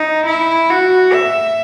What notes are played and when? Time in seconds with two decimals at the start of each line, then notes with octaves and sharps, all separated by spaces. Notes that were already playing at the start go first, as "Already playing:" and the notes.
Already playing: D#4
0.26 E4
0.70 F#4
1.14 E5